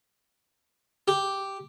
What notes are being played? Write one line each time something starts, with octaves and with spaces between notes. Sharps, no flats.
G4